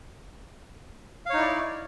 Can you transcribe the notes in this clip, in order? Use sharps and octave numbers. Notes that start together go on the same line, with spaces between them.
D#4 E4 C#5 D5 F5